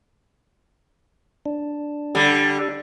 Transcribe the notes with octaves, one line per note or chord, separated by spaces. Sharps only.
D4
D3 G3